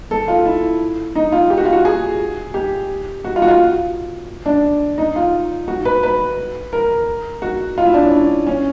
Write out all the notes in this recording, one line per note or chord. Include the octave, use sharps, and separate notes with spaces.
A4
F4
E4
D#4
F4
G4
F#4
F4
F#4
G#4
G4
F#4
F4
F#4
F4
D4
D#4
F4
F#4
B4
B4
A#4
F#4
F4
E4
D4
C#4
D4
C#4